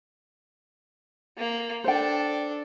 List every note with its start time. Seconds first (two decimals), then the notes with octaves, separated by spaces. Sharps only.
1.37 A#3
1.84 D4 A4 C5 G5